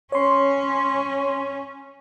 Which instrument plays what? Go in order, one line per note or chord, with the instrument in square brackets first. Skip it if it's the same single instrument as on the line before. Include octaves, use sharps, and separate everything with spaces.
[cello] C#4 [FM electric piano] C#5 C6